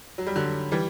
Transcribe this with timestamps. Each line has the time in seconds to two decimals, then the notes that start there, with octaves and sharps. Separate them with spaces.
0.18 F#3
0.27 G3
0.36 D3 F#3
0.72 E3 G3